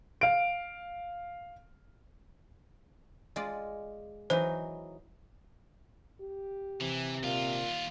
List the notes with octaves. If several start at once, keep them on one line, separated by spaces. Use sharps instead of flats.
F5 D7
G#3 F4 D5
E3 F#3 D#4 C5
G4
C3 E3
D#2 A#2 F4 F5